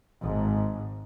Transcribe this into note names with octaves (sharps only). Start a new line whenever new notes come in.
G#1 G#2